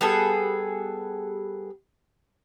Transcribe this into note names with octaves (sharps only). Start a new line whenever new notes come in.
G3 B3 G#4 A4